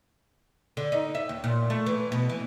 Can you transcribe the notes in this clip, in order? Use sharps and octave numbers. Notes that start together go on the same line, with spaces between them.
D3
D#4
E5
D#2
A#2
A3
E3
B2
E3